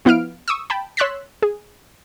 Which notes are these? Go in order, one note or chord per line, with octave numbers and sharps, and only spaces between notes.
F3 B3 E4 F5 F6 D7
C#6 D#6 E6
G5 A5 B5
C#5 C6 E6 F#6 A6 B6
G#4